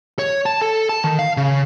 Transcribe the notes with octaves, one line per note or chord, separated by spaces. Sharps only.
C#5
A5
A4
A5
D#3
F5
C#3